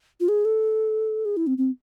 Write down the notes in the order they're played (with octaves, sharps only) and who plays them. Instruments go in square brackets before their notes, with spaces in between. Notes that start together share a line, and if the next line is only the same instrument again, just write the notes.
[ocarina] F4
G#4
A4
G#4
E4
C4
C4